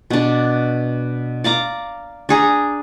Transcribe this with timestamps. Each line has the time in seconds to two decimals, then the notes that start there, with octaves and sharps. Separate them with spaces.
0.10 B2 D4
1.44 D5 F5 A#5 D6
2.29 D4 G#4 A#5